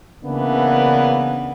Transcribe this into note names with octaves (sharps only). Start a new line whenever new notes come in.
C#3 E3 A#3 B3 D4